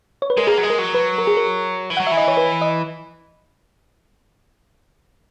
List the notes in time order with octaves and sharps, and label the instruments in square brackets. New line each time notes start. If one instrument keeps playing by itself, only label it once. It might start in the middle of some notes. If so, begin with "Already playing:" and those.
[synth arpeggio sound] C#5
B4
[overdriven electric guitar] G#3 [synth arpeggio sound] A#4
[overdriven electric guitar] A#3 [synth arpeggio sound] G#4
[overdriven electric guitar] F#3
G#3
[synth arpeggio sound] A#4
[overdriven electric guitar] F#3
[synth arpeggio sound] B4
A#4
G#4
A#4
[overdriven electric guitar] E3
[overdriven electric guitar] F#3 [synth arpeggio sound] F#5
[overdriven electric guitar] E3 [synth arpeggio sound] E5
[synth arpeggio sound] D#5
C#5
B4
D#5